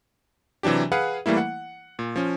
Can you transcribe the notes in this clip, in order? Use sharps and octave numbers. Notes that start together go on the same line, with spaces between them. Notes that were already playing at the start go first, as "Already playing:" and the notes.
C3 E3 F#3 D4 G4
G#4 B4 F5 F#5
E3 G3 A3 A#3 E4
F#5
A#2
F3 C#4